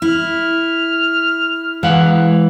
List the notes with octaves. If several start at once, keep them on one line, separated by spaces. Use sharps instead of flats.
E4 F6
E3 G#3 F5 F#5